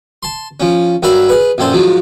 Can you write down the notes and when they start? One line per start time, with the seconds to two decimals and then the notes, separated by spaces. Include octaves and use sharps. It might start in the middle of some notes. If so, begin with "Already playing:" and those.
0.23 A5 C6
0.60 F3 C#4
1.03 G2 F#3 A#4 E5 B5
1.29 G#4 B4
1.58 A#1 F#2 C4 A4 C5
1.73 G#2 F3 F#3